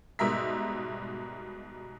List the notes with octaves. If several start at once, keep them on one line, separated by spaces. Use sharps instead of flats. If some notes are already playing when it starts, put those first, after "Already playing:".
G#2 B2 G3 A#4 E5 B6